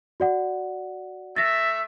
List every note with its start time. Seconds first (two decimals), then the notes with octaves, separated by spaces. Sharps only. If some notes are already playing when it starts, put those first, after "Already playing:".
0.20 F#4 D5 F#5
1.36 A3 E5 A6 A#6